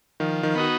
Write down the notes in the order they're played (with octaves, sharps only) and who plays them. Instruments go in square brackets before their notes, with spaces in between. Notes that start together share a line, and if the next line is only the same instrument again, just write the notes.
[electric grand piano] D#3 [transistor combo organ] F3
[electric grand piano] D#3
[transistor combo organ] B3 D#4 F#4